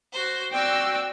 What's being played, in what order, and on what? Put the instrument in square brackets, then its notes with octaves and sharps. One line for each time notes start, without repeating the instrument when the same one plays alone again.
[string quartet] F#4 C5
[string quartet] C4 F#4 D5 [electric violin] G5 E6